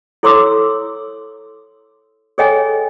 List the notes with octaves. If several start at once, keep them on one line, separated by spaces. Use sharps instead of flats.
E4 A4 C#5 C6 D6 E6
G#4 A4 C#5 D#5 G5 G#5